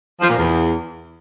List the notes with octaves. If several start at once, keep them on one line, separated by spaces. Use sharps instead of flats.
F3
A#2
E2